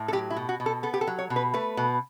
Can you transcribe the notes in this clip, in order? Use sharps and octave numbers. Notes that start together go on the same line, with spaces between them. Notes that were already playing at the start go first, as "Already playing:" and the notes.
Already playing: A2
A4
F#3 G4
E4
B2
F#4
B2
A4
B3 A4
G4
A4
F#3
C#5
B2
B4
A3 B4
B2